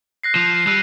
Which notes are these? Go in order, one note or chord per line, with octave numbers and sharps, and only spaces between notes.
F#6 A#6 C7
F3
C7
G3 E6 F#6 D#7